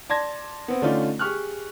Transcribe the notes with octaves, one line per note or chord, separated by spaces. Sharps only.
D5 A5 C6 G#6 A#6
B3 C4
D3 A3 C#4 D#4 F4 D5
G4 G#4 C#6 F6 F#6